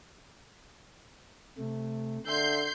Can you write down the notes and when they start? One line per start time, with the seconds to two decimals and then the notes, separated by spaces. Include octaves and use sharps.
1.58 C3 A3
2.27 D3 E5 C6 G6 C7